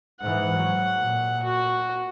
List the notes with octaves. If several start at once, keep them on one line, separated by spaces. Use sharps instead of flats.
G#2 E3 F#5
F#3
A#2
F#4